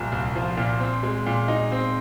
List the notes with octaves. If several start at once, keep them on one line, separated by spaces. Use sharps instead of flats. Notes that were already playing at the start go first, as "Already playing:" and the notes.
Already playing: C2 A#2 F3
C2
F3
A#2
C4
G#3
A#2
D#4
C4